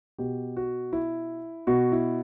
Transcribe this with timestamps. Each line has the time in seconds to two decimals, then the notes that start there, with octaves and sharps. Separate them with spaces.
0.18 B2 G4
0.57 F#4
0.93 E4
1.67 B2 F#4
1.92 E4